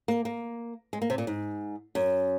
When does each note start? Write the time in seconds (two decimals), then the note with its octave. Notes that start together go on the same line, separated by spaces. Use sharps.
0.08 A#3
0.25 A#3
0.93 G#3
1.02 A#3
1.10 C3
1.18 A#2
1.27 G#2
1.95 F#2